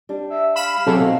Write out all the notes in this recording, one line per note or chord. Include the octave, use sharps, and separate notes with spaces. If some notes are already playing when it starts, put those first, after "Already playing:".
G3 D4
E5
F5 B5 E7
C3 F#3 C4 G#4 A4
B2 D#3